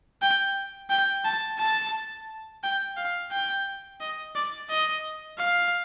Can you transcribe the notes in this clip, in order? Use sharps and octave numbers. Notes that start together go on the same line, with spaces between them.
G5
G5
A5
A5
G5
F5
G5
D#5
D5
D#5
F5